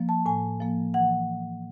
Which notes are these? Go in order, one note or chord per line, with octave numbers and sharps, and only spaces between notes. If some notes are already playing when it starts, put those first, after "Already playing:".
Already playing: F3 A#3
A5
A2 G#5
F3 A#3
E3 F#5